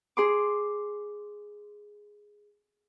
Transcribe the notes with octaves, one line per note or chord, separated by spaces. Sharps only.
G#4 C6 D6